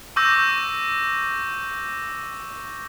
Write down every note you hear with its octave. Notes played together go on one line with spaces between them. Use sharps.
C#6 D6 E6 G6 A#6